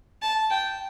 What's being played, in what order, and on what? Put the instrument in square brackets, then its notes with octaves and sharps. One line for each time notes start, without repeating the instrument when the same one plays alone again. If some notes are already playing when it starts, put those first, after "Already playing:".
[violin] A5
G5